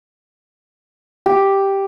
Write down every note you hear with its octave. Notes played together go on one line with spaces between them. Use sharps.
G4